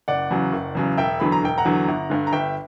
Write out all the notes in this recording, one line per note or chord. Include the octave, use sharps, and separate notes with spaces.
F#1 D5 F#5
E2 C#3 F#3
F#1
E2 C#3 F#3
E1 E5 G5
E2 D3 F#3 B5
A#5
E1 G5
F#5 A#5
E2 D3 F#3
G1
G2 D3
A#5
G1 E5 G5